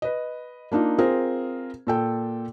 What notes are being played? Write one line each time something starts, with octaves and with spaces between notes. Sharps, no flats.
B4 D#5
A#3 D4 D#4 F4
C4 F4 G#4 A#4
A#2 A4 G5